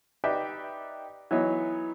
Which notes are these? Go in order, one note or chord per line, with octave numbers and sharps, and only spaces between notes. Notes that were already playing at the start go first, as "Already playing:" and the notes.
D#4 G4 B4 D5 E5 G5
E3 F#3 B3 D#4 C#5